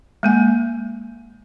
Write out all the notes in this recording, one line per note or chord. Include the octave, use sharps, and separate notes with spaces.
G#3 A#3 G#5